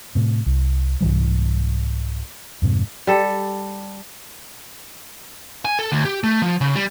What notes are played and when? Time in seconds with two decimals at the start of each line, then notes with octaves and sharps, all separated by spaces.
0.15 A2 C3
0.46 C2
1.01 C2 G#2 E3 G3
2.62 F2 G#2 C3
3.07 G3 A4
5.65 G#5
5.79 A4
5.92 D2
6.05 G4
6.24 A3
6.42 F3
6.61 C#3
6.76 G3